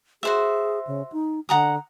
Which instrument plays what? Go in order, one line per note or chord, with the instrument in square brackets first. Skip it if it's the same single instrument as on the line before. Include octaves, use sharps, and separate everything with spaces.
[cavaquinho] F#4 C5 E5 [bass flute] G#4
[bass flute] C#3
D#4
[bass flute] D3 [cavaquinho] F#5 A#5 D#6